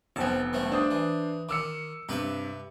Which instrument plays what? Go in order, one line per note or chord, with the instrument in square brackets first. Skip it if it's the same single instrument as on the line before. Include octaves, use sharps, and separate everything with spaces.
[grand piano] F1 B3 G5 [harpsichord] F3 A5
[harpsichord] G2 F3 A3
[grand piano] D4 C5 D#6
[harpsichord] E3
[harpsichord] D#3 [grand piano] D6 E6 C#7
[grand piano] G2 C3 [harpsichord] G4 B4 E5